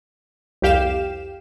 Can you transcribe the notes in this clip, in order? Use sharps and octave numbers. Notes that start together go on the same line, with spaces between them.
C2 F2 G4 F5 G5 E7